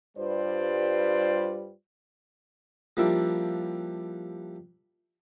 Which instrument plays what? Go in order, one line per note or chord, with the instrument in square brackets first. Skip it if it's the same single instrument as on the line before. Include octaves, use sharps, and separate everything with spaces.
[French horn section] G2 G3 F4 B4 C5 D5
[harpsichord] F3 G3 A#3 D4 E4